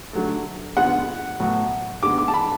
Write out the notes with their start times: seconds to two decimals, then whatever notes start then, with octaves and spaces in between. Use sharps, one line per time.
0.13 D3 F#3 A3
0.77 D3 G#3 B3 F4 F#5
1.40 A2 F#3 B3 F#4
2.03 D3 G#3 B3 D6
2.18 D6
2.28 A5
2.34 B5